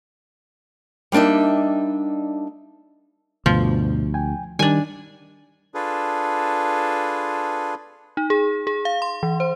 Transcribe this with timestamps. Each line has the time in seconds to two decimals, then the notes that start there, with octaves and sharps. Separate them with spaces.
1.12 G3 A#3 D4 D#4 E5
3.46 D2 G2 B2 F3
4.14 G5 G#5
4.59 D#3 G3 D4 G#5
5.75 D4 F4 G#4 A4 B4
8.17 D#4
8.30 G#4
8.67 G#4
8.85 F5
9.02 C6
9.23 E3
9.40 C5